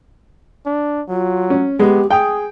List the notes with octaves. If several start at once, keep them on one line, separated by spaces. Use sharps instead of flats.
D4
F#3 F4
C#4
G#3 B3 G4
G#4 G5 D#6